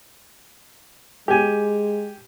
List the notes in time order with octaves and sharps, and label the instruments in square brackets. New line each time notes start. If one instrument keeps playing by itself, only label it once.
[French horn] G#3 [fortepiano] G4 G#5